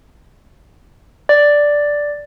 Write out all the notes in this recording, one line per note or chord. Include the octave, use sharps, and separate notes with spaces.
D5